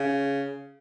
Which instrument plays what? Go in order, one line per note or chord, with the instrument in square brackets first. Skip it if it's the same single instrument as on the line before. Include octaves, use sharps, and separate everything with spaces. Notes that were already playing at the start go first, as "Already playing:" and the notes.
Already playing: [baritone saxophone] C#3